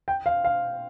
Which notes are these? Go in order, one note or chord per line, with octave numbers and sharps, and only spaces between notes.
G5
F5
F5